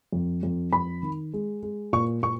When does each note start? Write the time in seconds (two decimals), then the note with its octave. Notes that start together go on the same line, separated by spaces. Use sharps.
0.12 F2
0.43 F2
0.73 F2 B5
1.03 D#3
1.33 G#3
1.63 G#3
1.93 A#2 C#6
2.22 A#2 C#6